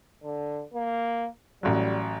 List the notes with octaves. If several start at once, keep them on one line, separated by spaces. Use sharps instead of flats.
D3
A#3
A1 F#3 G3